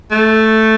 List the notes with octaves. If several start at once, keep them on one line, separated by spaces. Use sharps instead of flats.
A3